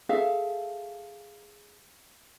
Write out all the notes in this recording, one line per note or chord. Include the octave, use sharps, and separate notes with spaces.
G#4 A4 E5 F5